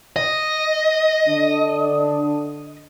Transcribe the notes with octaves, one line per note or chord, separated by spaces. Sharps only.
D#5
D3 D4